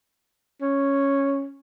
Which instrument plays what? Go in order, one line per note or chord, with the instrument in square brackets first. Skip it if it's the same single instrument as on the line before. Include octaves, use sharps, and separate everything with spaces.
[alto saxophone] C#4